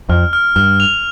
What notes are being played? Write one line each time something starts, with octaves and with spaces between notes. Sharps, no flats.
F2 F6
F6
G2 F6
F7